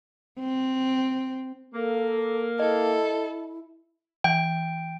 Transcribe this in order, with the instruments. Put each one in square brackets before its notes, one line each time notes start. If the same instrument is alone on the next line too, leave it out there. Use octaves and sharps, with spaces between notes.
[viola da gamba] C4
[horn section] A#3 [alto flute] A4
[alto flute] E4 [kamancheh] A4 [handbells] D#5
[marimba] E3 [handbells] G5